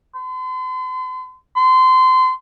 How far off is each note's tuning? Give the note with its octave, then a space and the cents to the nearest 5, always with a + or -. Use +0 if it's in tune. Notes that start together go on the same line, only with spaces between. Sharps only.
C6 -40
C6 -25